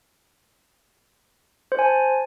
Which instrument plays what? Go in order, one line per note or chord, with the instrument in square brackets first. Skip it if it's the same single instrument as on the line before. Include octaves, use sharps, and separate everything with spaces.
[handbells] C5
G#5
A5